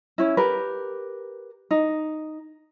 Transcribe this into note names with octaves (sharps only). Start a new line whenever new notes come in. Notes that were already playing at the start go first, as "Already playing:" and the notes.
C#4 E4
G4 A#4 B4
D#4